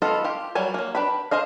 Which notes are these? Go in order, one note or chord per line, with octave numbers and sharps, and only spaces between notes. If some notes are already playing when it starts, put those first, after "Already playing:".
B3 F4 A4 D#5 F5
F4 G4
F#3 G3 G#5
F#3 A#3
D4 B4 G5 B5
G#4 C5 D#5 F5